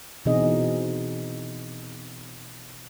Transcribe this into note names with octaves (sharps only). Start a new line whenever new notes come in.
B2 E3 C4 D#4 G#4 D#5